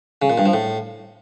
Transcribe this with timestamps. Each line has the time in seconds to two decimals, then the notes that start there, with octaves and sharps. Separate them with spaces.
0.22 C#3
0.30 A#2
0.38 G2
0.46 F3
0.53 A2